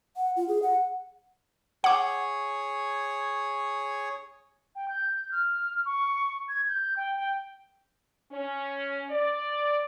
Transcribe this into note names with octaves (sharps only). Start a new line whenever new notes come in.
F#5
F4
G#4
F#5
G#4 C#5 F#5 D6
G5
G6
F6
C#6
G#6
G6
G5
G5
C#4
D5